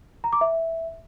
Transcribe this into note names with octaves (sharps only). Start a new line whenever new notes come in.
A#5
D6
E5